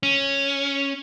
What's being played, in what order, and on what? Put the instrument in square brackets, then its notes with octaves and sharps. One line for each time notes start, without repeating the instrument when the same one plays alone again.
[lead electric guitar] C#4